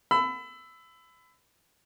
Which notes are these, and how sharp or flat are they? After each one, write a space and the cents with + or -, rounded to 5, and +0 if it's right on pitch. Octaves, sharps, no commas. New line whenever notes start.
B5 +30 E6 +0